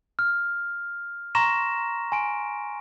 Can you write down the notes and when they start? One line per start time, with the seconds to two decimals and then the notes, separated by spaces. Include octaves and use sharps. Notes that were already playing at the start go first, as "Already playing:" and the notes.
0.19 F6
1.35 A#5 C6 C#6 A#6 E7
2.12 G#5 C6 D7